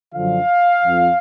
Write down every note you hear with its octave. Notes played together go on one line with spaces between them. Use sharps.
F#2 D3 F3 F5
F2 F3